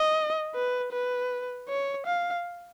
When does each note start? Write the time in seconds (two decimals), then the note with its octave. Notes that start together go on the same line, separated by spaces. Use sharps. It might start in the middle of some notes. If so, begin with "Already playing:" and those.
Already playing: D#5
0.55 B4
0.93 B4
1.69 C#5
2.07 F5